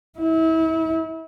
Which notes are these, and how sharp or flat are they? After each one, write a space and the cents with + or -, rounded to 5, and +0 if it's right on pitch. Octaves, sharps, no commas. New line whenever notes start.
E4 -35